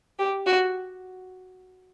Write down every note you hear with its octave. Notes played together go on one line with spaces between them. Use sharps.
G4
F#4